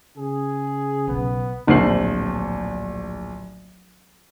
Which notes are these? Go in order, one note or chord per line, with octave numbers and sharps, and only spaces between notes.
C#3 G#4
B1 B3
D1 A#1 D4 C5 C7 F#7